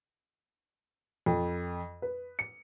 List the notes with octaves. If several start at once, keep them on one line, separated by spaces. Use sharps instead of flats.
F2
B4
C#7